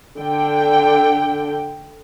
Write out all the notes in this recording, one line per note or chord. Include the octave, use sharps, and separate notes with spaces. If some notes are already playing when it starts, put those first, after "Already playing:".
D3 G5